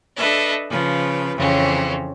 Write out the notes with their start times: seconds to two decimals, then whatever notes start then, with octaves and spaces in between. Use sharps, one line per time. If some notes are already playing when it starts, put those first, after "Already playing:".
0.16 D4 A4 B4 D#5 E5
0.69 C#3 F3 B4
1.37 F2 C#3 E3 C4 C#4